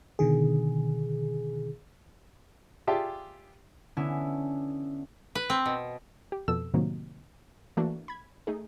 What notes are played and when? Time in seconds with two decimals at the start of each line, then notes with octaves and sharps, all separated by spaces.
0.19 B2 D3 D#3 G#4
2.87 F4 G4 G#4 D5 E5 A5
3.97 D3 B3 C#4 E4
5.35 B4
5.50 C4
5.66 B2
6.32 G4
6.48 F2 B2 A4 E6
6.74 A2 C3 D#3 F#3 A#3
7.77 E3 A3 A#3 D4 F#4
8.08 B5 G#6
8.47 A3 D#4 G#4